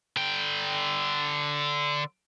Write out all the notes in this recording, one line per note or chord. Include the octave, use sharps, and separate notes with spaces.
D3 G5